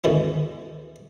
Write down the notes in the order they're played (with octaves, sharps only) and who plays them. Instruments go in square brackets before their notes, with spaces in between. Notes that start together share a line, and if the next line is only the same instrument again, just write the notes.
[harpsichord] D2 G#2 B2 D#3 E3 C#4